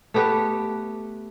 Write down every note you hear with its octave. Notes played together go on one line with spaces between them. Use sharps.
A3 B3 G4 B4